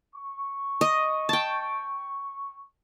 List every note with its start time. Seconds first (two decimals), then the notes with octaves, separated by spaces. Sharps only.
0.15 C#6
0.81 D#5
1.29 G5 A5